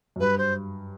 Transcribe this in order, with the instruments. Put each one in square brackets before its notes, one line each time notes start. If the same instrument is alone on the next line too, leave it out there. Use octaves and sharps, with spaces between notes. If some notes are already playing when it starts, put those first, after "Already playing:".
[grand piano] F#2
[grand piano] G2 [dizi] B4
[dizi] C5